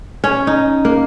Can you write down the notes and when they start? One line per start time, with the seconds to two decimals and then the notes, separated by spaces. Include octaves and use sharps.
0.24 C#4
0.47 D#4
0.85 A#3